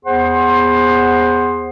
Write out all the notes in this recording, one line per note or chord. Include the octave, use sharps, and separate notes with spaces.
E2 B3 G#4 C5 F#5 C6